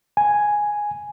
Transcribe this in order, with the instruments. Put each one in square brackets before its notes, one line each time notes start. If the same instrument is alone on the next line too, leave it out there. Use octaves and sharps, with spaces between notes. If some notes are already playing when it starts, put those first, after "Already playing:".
[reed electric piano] G#5